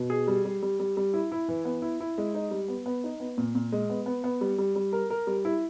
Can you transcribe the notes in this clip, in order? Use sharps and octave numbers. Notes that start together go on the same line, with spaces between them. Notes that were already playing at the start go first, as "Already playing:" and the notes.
Already playing: B2
G#4
G3
G3
G3
G3
G3
E4
E4
E3
B3
E4
E4
G#3
D#4
G3
B3
B3
D#4
B3
A#2
A#2
G#3
B3
B3
B3
G3
G3
G3
A#4
A#4
G3
E4